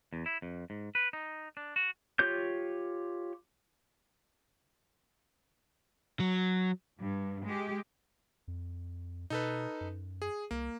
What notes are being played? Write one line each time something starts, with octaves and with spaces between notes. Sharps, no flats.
E2
E4
F2
G#2
B4
D#4
D4
F#4
F4 G4 C#5 G6
F#3
G2
G#3 G4
F2
B2 D#4 A4 B4
F#2
G#4
C2 A#3